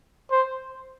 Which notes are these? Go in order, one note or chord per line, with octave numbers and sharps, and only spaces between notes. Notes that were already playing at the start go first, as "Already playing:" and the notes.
C5